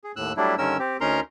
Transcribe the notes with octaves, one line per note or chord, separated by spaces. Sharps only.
G#4
D#2 A2 E6 F#6
F#3 G3 A3 D4 E4
G2 D3 D#3 C#4 A#4 E6
C4 G4
D2 C#4 D#4 A#4 A#5 C6